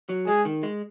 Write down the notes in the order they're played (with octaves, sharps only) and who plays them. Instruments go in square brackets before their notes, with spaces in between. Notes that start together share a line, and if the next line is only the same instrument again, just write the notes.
[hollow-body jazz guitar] F#3
[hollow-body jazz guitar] G#3 [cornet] G#4
[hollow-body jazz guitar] D#3
G#3